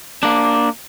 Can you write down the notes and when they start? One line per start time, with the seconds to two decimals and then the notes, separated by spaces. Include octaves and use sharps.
0.23 A#3 D4